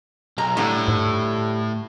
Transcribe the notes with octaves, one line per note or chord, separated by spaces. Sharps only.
B1 A#5
A2 D3 G3
G#2